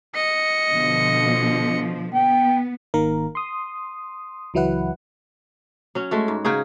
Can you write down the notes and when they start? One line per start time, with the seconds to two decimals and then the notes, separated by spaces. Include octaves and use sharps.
0.15 D#5 C#7
0.72 B2 D3 F3
2.14 B3 G5
2.94 G#1 D#3 A#3 A#4
3.35 C6 D#6
4.54 C#2 E3 F#3 E4 B4 F#5
5.95 F#3 C#4
6.11 G#3 A3 F#4
6.28 G#2
6.45 C#3 D#4 F#4 G#4